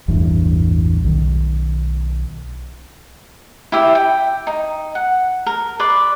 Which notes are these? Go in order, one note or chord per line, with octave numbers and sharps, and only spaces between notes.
A1 E2 G2
B1 D#3
E4 G4 E5
G5
D#4
F#5
A#4
B4 D5 C6